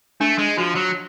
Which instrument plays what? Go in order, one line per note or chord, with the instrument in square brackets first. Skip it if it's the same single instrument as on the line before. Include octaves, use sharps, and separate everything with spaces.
[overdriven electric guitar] A3 [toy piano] D4
[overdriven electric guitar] G#3
[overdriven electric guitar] F3 [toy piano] F#4
[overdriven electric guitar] F#3